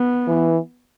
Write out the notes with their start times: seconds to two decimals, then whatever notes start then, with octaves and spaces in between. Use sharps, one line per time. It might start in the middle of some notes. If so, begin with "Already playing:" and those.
Already playing: B3
0.27 E3